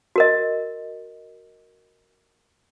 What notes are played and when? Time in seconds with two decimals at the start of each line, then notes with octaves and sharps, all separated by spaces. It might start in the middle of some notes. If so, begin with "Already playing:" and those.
0.16 F#4 A#4 D#5